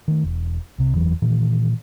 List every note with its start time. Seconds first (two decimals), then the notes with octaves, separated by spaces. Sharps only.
0.08 D#3 A3
0.24 E1
0.78 C2 C3
0.94 F#1 E2 E3 F#3
1.22 A#2 D#3 E3